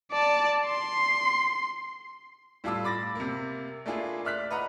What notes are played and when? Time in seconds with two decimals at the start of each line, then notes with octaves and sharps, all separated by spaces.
0.12 D5 A5
0.67 C6
2.64 A2 G3 F4 A4 D6 E6
2.85 B5 D6 A6 A#6
3.15 C3 A#3
3.86 A3 A#3 D4 E4 F4 G#4
4.25 D5 E5 F6 F#6 B6
4.51 B4 D#5 F#5 A#5